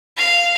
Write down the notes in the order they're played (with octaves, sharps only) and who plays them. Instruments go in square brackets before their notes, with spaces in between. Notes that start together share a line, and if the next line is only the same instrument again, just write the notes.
[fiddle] F5